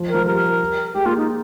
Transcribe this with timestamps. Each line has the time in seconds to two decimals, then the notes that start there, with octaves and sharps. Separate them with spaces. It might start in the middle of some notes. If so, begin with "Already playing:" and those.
Already playing: F3
0.09 A#4
0.14 F3
0.26 G3 A#4
0.94 G#3 G4
1.05 A#3 F4
1.17 D#4